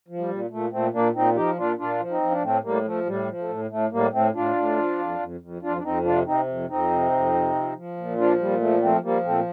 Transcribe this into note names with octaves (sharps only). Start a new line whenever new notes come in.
F3
G3
A#2
A#2 A3
A#2 A3 C4
A#2 A#3 D4
A#2 C4 D#4
F3 D#4 G4
A#2 D4 F4
A#2 D4 F4
F3
C4 D#4
F3
D4
A2 A3 C4
A2 G3 A#3
F3 A3
A2 G3
F3
A3
A2
A2 A3
A2 G3 A#3
A2 A3 C4
A2 D4 F4
A2
F3
F2
F2
F2
F2 D4 F4
D4
F2 C4 D#4
C3 D4 F4
C3 C4 D#4
F2
F2 C4 D#4
C3
F2
C3
F3
F3
A#2
F3 D4 F4
A#2 G3
F3 A3
F3 A3 C4
F3 G3 A#3
A#2 A3 C4